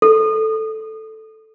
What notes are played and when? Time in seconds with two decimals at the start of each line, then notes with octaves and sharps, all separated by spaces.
0.02 A4